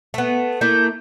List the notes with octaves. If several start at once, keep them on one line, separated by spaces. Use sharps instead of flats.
A3 B3
A3 A#3 E4 G6